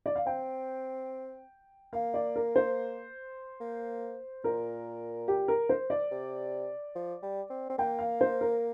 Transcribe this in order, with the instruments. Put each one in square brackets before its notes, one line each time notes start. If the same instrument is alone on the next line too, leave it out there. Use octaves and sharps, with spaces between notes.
[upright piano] D5
F5
[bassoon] C4 [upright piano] G5
[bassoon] A#3 [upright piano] F5
[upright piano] D5
A#4
C5
[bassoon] A#3
[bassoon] A#2 [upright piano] A#4
[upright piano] G4
A#4
C5
D5
[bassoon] C3
F3
G3
C4
C4
[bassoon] A#3 [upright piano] G5
[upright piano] F5
C5
A#4